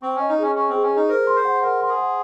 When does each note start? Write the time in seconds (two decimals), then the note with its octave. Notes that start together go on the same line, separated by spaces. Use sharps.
0.02 C4 C#6
0.16 C#4 D#5
0.29 D#4
0.38 C#4 G#4
0.55 C#4 C#6
0.69 C4 G#4
0.83 C#4
0.91 D#4 G#4
1.09 A#4 C5
1.27 C6
1.36 C5
1.45 F#5
1.62 A#4 F#5
1.81 C6
1.89 G#4
1.98 F#5